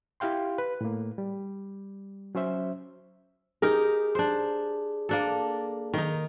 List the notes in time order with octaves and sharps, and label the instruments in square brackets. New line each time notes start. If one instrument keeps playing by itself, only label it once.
[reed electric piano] E4 G4 F5 G5 C6
B4
A2 A#3
G3
F#3 C#4 C5 E5
[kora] D#4 G4 A#4 [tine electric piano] G#4
[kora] D4 C5
A#3 D4 A4
D#3 D#4